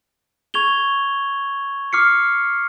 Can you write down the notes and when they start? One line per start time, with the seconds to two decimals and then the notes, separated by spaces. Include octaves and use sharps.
0.54 C#6 G#6 F7 G7
1.93 D6 F6 C7 C#7